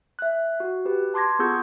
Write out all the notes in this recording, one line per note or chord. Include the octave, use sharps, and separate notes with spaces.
E5 F#6
F#4
G4 B4
A5 C6 D6 G#6 A#6
B3 F4 G#4 C#6 E6 G6